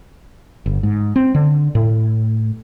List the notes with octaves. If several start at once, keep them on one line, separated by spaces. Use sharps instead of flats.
G1
G#2
C4
D3
A2